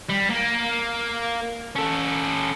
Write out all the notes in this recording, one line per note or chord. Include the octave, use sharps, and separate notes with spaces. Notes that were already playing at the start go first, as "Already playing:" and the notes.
G3
A#3
C#4 A4